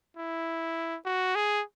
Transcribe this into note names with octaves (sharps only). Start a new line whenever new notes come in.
E4
F#4
G#4